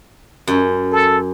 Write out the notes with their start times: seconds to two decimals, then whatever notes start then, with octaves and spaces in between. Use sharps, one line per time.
0.47 F#2
0.92 A4